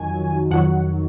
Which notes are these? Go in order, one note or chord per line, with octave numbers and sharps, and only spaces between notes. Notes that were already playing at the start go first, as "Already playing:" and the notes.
Already playing: F2 D#3 F#3 G#5
F2 D#3 F#3 F#5